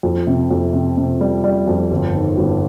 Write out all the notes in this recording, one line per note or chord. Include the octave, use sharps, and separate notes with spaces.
F2
C3
F2
C3
C3
G3
G3
F2
G1
D#3
G1